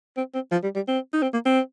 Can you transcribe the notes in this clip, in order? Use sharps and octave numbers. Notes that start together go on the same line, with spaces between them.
C4
C4
F3
G3
G3
C4
D#4
C4
A#3
C4